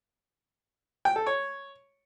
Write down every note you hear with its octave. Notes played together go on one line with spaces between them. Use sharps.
G5
A4
C#5